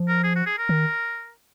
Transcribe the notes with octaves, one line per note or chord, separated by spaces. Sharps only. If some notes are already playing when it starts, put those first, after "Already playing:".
Already playing: F3
A#4
G#4
F#4
G#4
A#4
D#3